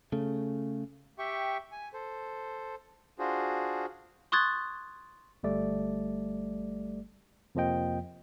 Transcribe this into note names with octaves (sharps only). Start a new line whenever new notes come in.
C#3 A3
G4 E5 G5 C#6
G#5
A4 C5
D4 F4 F#4 G#4 C5
C6 C#6 D#6 F#6 G#6 A6
G1 G3 A3 D5
F2 C3 F3 A#3 D#5 G5